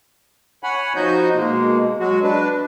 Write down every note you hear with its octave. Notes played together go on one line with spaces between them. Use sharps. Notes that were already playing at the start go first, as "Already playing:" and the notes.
C#5 F#5 G#5 B5
F3 D#4 F#4 D#5 G6
B2 G#3 A#3
F#3 G#3 F#4
D4 B4